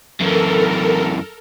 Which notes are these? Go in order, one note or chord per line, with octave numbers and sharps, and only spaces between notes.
F#2 E3 A4 A#4